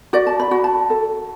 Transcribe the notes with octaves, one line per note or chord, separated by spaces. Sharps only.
F#4 D5
A5
B5
F#4
A5
A4